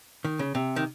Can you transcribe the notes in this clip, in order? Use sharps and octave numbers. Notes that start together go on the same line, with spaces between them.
D#3
C#3
C3
D#3